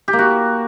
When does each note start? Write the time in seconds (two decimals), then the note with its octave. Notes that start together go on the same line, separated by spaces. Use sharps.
0.08 G4
0.13 A#3
0.19 F#4